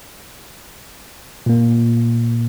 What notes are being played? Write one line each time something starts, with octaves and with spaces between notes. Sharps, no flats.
A#2 A#3